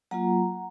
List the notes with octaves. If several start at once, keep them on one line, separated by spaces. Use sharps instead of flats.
F#3 A#3 F4 F#5 A#5